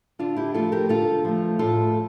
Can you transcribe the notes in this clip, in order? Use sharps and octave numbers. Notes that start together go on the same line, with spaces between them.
D3 D4 F4
E4 G4
F3 A3 F4 A4
G4 A#4
D3 F4 A4
F3 A3
A2 F4 A4